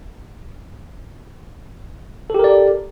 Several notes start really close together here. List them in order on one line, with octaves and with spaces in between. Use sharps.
A4 G4 A#4 D5